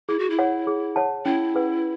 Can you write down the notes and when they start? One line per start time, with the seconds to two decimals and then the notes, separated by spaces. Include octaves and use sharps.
0.09 E4 G#4
0.19 F#4
0.30 E4
0.39 C#5 F#5
0.67 G#4
0.96 C#5 F#5 A5
1.26 C#4 E4
1.54 G#4 B4 F#5